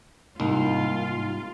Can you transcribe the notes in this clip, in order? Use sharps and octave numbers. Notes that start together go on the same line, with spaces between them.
C2 G#2 G#3 A#3 D#4 F4